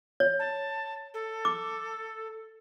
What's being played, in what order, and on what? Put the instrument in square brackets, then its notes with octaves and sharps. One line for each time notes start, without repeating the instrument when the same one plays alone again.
[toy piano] C#5
[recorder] A5
A4
[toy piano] D6